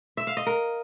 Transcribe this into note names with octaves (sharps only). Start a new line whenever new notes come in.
E5
F5
D#5
A#4